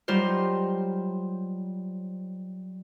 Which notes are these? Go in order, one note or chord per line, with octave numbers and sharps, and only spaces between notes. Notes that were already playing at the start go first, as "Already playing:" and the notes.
F#3 G3 D#4 F4 C5